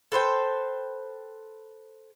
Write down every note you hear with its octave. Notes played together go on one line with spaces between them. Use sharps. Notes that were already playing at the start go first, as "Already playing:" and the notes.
A4 B4 C5 G5